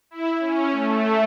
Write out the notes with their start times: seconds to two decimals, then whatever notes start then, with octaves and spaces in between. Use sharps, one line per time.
0.11 E4
0.40 C#4
0.71 A3